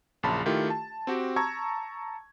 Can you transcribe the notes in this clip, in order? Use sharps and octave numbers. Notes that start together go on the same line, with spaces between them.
A#1 F#2 C#3 A5 B5 C6
D#3 A3 E4 F4 G4
A5
C4 F#4 G4
A5 A#5 C#6 E6 G#6